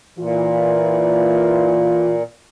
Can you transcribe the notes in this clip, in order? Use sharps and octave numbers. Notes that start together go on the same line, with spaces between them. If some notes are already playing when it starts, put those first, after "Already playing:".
A#2 E3 F4